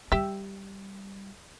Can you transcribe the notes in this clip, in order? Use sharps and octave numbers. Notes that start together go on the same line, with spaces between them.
G3 G4 E5